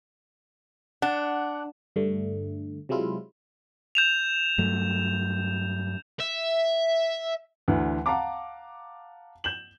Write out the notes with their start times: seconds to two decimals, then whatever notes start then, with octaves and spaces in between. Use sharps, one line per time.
1.02 D4 F#5
1.96 G2 D3 A3
2.89 C3 F#3 G#3 E4 F4
3.95 G6 E7 F7
4.58 G2 F#3 A3
6.20 E5
7.68 D2 D3 E3
8.06 F5 F#5 A5 A#5 D6
9.44 G6 E7 F#7